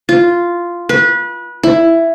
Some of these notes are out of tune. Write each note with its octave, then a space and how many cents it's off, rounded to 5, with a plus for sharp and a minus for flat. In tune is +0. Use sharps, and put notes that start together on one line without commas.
F4 -5
B4 -25
E4 +10